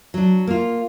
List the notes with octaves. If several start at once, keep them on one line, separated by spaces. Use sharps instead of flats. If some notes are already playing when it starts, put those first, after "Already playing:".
F#3 D4
A#3 F4